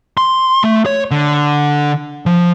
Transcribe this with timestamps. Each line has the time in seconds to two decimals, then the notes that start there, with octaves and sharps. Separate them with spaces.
0.17 C6
0.64 A3
0.86 C#5
1.11 D3
2.26 F3